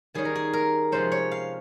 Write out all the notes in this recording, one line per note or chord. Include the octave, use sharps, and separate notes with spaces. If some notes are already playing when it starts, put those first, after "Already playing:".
D#3 G3 C#4 G#4
A#4
G#4
A#4
C3 F3 G#3 C#4 C5
C#5
F5